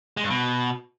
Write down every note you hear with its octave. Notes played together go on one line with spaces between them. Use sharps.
G#3
G2
B2